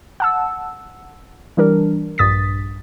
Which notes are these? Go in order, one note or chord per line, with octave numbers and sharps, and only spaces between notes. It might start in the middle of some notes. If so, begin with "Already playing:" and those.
F#5 A5 E6
E3 G3 D4 A#4
A#1 G2 D#6 A6 B6